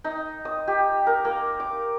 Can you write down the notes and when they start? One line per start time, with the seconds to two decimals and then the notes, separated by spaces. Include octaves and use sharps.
0.04 D#4
0.45 D#6
0.68 G4
1.07 A#4
1.25 A#3
1.60 D6